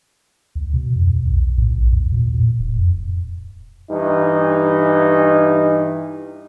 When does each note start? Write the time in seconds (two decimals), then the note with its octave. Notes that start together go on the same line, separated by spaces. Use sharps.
0.55 D2
0.73 B2
0.96 F2
1.15 D#2
1.29 B1
1.58 A2
1.75 A#1
1.90 E2
2.12 A#2
2.34 A2
2.59 D#1
2.77 F2
3.90 G2 E3 D#4